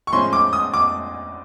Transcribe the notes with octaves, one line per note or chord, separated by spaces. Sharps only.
C#6
A2 F3 G#3 C#4 C6
D6
D#6
D6